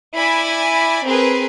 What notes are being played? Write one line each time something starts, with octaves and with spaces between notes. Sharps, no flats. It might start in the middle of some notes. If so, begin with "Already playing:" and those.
E4 D5 G#5 B5
C4 G#4 A#4 B4